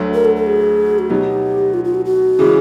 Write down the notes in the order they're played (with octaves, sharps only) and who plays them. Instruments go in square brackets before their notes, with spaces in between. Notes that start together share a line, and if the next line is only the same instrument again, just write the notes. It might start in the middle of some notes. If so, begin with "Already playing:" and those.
Already playing: [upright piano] D2 D3 F#3 A3
[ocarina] A#4
A4
A4
G#4
F#4
[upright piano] B2 F#3 B3 D#4 [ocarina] G4
[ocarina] F4
F4
F#4
F#4
[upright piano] C#3 E3 G#3